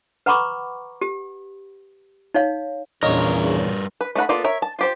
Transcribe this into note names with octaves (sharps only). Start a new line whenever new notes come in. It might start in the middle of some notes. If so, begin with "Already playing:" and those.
B4 F#5 A#5 B5 C#6 D6
G4
D#4 C#5 F5
A#1 E2 G2 C#3 A#4 C#5 D#5 C#6
B4
A3 D#4 F#5 B5
A#3 B3 F4 A4 D5
A#4 C#5 E5
A5
F4 G4 C5